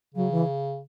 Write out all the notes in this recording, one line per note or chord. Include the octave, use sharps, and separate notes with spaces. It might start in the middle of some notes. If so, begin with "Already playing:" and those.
C#3 F#3
E3